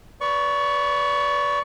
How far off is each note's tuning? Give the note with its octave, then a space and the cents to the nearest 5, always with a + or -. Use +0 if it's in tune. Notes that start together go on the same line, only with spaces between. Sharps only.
B4 +0 D5 -25 C#6 +15